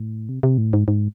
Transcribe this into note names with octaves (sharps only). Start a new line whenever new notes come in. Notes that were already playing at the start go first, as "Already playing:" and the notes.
Already playing: A2
C3
C3
A2
G#2
G#2